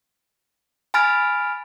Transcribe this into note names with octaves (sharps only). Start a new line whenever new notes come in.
G#5 B5 F6 A6 D7